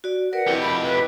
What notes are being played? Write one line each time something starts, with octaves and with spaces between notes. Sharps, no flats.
F#4 D5
A#4 B4 D5 F#5
F2 E4 G4 D#5
B5
B4